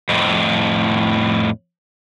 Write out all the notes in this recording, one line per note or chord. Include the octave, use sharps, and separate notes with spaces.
F2 A2